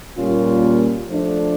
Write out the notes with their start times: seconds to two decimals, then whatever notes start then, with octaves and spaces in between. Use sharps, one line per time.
0.16 A#2 G3 A#3 C#4 F4
1.08 F3 A3 D4